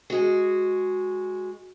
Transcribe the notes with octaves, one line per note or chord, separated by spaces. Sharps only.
G#3 F#4